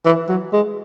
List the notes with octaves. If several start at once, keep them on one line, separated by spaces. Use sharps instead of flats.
E3
F#3
G#3